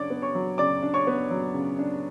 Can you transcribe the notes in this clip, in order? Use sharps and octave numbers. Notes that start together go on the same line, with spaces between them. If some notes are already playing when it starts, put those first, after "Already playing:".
Already playing: C#3 F#3 D4 C#5 D5 D6
B3
C#5 C#6
F#3
C#3 D5 D6
D4
C#5 C#6
B3
F#3
C#3
D4